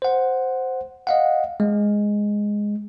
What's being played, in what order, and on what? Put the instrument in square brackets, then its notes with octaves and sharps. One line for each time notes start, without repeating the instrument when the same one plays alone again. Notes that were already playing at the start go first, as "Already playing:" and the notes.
[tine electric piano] C5 F#5
D#5 F5 F#5
G#3